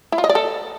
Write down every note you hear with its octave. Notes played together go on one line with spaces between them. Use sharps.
E4
F4
D#5
D5
A4